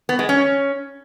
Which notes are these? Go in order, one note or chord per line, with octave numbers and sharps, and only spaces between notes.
B3
G#3
C#4